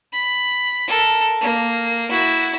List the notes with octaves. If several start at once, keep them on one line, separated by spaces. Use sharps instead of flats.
B5
A4 A#4
A#3
E4 F#4